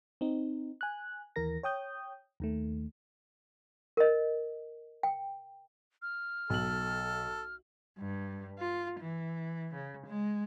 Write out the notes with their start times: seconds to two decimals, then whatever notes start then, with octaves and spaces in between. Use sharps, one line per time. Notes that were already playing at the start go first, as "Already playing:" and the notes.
0.21 C4 D#4
0.81 G#5 F#6
1.36 D#2 E3 A#4 A#6
1.63 C#5 G5 D#6 G6
2.40 D#2 D#3 A3
3.97 A#4 D#5
5.03 G5
6.02 F6
6.50 B1 A4 F#7
7.98 G2
8.58 F4
9.00 E3
9.74 C#3
10.07 G#3